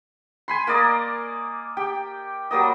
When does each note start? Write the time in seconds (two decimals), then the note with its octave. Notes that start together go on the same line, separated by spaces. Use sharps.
0.48 G#5 B5 C6
0.67 A#3 A#4 D5 D#5
1.77 G4 G5
2.51 F#3 G3 A#3 D#5